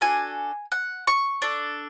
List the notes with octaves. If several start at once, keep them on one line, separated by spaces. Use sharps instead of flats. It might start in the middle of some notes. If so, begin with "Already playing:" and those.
D4 F#4 A4 G#5
F#5
C#6
D4 A4